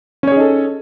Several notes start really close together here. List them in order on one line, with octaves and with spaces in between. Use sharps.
C#4 C#5 G#4 D#4 A4